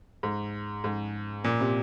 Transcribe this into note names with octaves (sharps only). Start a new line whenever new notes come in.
G#2
G#2
A#2
C3